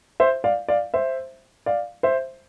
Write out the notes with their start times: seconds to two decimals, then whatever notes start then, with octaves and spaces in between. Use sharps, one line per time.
0.20 C5 E5
0.44 D5 F5
0.68 D5 F5
0.94 C5 E5
1.66 D5 F5
2.03 C5 E5